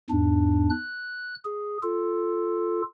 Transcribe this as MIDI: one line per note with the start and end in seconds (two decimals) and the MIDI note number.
0.10 0.69 40
0.10 0.69 44
0.10 0.69 62
0.70 1.35 90
1.45 1.78 68
1.83 2.82 65
1.83 2.82 69